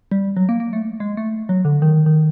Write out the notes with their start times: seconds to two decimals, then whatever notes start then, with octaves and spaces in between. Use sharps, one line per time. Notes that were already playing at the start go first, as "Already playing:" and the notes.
0.12 G3
0.37 F#3
0.49 A#3
0.60 A#3
0.73 A3
1.00 G#3
1.17 A3
1.49 F#3
1.65 D3
1.82 D#3
2.06 D#3